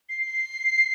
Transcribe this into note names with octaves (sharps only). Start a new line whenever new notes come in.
C7
C7